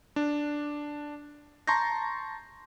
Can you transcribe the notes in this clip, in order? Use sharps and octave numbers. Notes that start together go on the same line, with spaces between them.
D4
A5 A#5 C6 C#6 G6 A#6